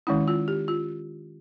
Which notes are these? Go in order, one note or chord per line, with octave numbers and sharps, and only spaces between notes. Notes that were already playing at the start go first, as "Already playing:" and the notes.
D#3 G#3 C#4 E4
F4
G4
F4